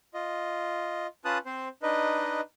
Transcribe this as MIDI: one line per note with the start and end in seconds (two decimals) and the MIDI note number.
0.14 1.07 65
0.14 1.07 75
1.25 1.38 61
1.25 1.38 65
1.25 1.38 71
1.25 1.38 81
1.25 1.38 87
1.25 1.38 90
1.46 1.68 60
1.46 1.68 72
1.83 2.41 62
1.83 2.41 63
1.83 2.41 71
1.83 2.41 75